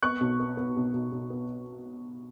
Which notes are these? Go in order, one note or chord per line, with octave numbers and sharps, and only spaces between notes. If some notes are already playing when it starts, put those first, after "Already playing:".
B3 C#6 F#6
B1
B3
B3
B1
B1
B1
B3